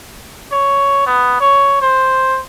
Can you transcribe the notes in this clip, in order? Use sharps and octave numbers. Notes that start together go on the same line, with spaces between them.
C#5
B3
C#5
C5